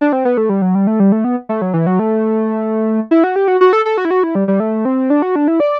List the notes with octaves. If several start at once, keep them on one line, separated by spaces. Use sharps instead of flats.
D4
C4
B3
A3
G3
F#3
G3
A3
G3
A3
B3
A3
F#3
E3
F#3
A3
E4
F#4
G4
F#4
F#4
A4
A4
F#4
E4
F#4
E4
G3
G3
A3
C4
D4
F#4
D4
E4
D5